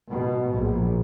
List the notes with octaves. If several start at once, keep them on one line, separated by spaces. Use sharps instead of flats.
B2
A#1